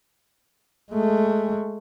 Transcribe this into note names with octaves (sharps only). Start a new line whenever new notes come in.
G#3 A3